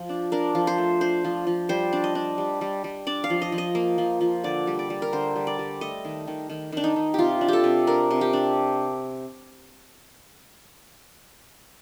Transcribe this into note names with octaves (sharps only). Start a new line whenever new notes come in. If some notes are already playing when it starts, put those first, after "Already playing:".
Already playing: F3
D4
D4 A#4
F3
C5
A3
D4 C5
F3
F3
G3 C5
D4
D#5
D4
G3
G3
G3
D4 D5
F5
F3
D#5
F3
D#5
A#3
F3
F3
D3 D5
G3
D5
G3
A#4
D3 C5
G3
D5
G3
A3 D#5
D#3
D#3
D#3
D#3 D4
D#4
D#3
C3 F4 G4
D4
G4 A4
C3
D4 A#4
C3
G4
D4